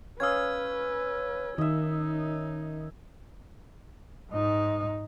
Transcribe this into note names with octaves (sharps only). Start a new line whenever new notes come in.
C#4 B4 F5 D#6 E6 G#6
D#3 D#4 D#5 E5
G#2 D#4